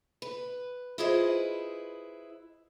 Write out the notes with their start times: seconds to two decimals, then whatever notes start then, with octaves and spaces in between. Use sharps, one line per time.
0.22 B4
0.98 E4 F4 G#4 B4 C5 D#5